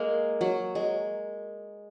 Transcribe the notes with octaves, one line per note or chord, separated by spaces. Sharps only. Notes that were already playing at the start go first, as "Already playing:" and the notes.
Already playing: G#3 A#3
F#3
G#3